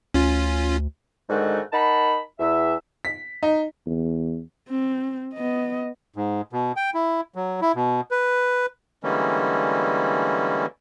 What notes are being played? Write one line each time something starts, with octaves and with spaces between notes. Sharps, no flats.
D2 C#4 F4
G#2 D3 D#3 G#3 A3 F#4
D#4 A#4 F#5 A5 B5
E2 E5
B6
D#4
E2
C4
B3 D#5
G#2
B2
G5
E4
F#3
E4
B2
B4
D3 E3 G3 G#3 A#3 C#4